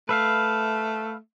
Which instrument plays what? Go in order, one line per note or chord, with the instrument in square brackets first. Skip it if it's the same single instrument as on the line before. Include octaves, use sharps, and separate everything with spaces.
[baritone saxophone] A3 [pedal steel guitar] B4 E5 F5